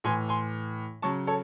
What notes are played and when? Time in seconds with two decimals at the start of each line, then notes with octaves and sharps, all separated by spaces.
0.04 A2 E3 G#5 C6
0.29 G#5 C6
1.02 C#3 F#3 A5 C#6
1.27 A4 C#5